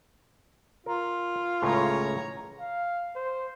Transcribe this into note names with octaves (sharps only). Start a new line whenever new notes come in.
F4 A#4
C#2 A2 C#3 C#5 A#5
F5
C5